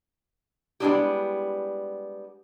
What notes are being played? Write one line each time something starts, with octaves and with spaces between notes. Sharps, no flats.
G3 G#3 B3 D4 E4 G4